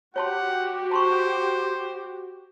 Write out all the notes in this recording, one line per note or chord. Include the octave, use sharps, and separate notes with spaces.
F#4 G4 C#5 F#5 A5 C6
C5 A5 C6 C#6